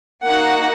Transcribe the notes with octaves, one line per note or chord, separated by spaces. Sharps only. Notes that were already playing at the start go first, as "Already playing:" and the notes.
A#3 D#4 F#4 F#5